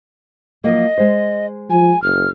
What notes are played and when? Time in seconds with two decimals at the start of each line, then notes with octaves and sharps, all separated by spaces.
0.64 F3 F#3 A#3 D#5
0.98 G#3 C5
1.70 F3 G#5
2.02 F#1 F6